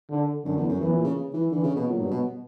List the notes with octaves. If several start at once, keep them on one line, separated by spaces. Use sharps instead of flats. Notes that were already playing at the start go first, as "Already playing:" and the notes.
D3
F#2 D3
E2
F#2
E2 E3
A#2
C#3
E3
D3 E3
C#3
B2
A#2 F#3
G2
B2